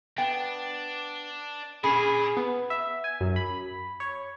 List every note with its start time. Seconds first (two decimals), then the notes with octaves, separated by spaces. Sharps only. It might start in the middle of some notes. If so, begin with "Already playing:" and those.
0.18 B3 D4 G5
1.84 A#2 C#4 G#4 B5
2.37 B3
2.70 E5
3.04 G#5
3.21 F#2
3.36 B5
4.00 C#5